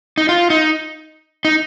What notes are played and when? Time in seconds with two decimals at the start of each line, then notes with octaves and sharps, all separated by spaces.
0.18 D#4
0.29 F4
0.50 D#4
1.45 D#4